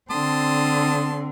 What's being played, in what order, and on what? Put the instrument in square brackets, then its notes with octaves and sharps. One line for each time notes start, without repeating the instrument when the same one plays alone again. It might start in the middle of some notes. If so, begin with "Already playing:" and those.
[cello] D3 C4 [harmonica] A5 C6 D#6